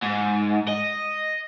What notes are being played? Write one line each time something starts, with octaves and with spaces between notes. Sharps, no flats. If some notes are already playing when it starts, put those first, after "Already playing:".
G#2
D#5